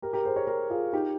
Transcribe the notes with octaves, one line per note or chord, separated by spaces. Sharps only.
G4 A#4
G4 A#4
G#4 C5
A#4 C#5
G4 A#4
F4 G#4
D#4 G4